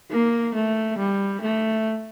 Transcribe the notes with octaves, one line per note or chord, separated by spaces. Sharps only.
A#3
A3
G3
A3